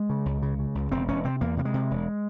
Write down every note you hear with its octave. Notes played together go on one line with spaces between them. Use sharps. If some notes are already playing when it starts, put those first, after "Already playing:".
Already playing: G#3
C#3
C#2
C#3
C#3
C#2
E1 C4
E1 C#4
C3 C4
E2 A#3
C3 A#3
G#3
C3
E1